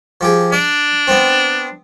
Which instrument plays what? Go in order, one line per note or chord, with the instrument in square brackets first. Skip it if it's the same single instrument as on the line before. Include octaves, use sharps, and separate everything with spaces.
[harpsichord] F3 G4 G#4
[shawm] D4 [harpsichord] D5
[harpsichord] B3 C4